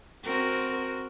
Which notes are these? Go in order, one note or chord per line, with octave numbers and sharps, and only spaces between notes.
C4 F#4 A#4